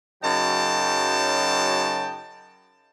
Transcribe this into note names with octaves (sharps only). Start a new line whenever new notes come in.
F#2 C#3 F#3 D#4 G5 A5